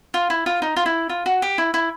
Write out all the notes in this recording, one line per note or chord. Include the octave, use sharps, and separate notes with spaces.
F4
E4
F4
D#4
F4
E4
F4
F#4
G4
E4
E4